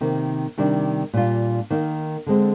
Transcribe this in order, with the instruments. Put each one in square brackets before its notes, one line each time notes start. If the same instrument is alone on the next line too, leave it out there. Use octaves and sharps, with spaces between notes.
[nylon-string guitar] C3 D#3 A#3
C3 D#3 G3 D4
A#2 G3 D4 F4
D#3 A#3 D#4
D3 G#3 C4